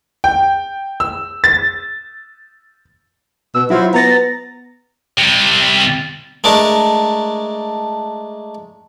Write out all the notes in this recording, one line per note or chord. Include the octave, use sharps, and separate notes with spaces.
G5
E6
A6
B2 E6
F#3 E4 F4 C5
B3 A#5 A6 A#6
C3 G3
G#3 A3 D4 A#4